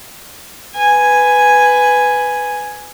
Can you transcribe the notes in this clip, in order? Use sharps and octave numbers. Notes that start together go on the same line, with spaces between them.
B4 G#5